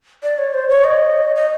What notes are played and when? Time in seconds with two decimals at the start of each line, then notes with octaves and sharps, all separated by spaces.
0.23 D5
0.38 C#5
0.54 C5
0.69 C#5
0.84 D#5
1.35 D#5